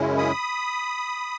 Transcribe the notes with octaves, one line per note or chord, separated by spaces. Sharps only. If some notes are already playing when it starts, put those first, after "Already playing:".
Already playing: F#2 C#3 G#3 C#4 E4
B5 D#6